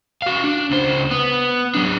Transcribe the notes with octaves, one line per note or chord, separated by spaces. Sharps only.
F#4 F5
D4
C#2 C5
B3
F#3 D4